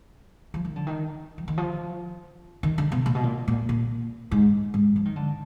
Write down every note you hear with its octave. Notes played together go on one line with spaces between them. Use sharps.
F3
D#3
D3
D#3
F3
D#3
F3
D#3
D3
B2
A#2
B2
A#2
A#2
A#2
G#2
G#2
F3
D#3
D3